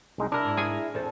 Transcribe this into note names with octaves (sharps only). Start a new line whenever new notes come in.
C2 G#3 D#4
D4 E4 A#4
G#2
G#4 G#5
E2 C4 A4